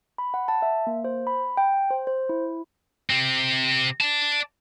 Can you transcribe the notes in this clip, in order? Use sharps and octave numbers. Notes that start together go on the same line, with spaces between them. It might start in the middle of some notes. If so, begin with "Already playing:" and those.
B5
F#5
A5
E5
A#3
C5
B5
G5
C5
C5
E4
C3 C4
D5 A5